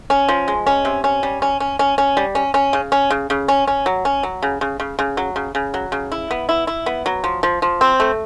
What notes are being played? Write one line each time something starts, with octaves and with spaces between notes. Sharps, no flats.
C#4
F3
G#3
C#4
C3
C#4
G3
C#4
C#4
C#4
C#4
G3
C#4
C#4
C#3
C#4
C#3
C#3
C#4
C#4
F#3
C#4
F#3
C#3
C#3
C#3
C#3
F#3
C#3
C#3
F#3
C#3
E4
B3
E4
E4
B3
F#3
F3
F3
F3
C4
A3